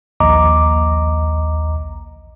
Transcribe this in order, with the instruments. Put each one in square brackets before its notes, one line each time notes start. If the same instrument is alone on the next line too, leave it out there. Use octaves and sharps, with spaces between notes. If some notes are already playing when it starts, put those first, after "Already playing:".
[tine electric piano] A#1 D#2 D#5 A#5 D6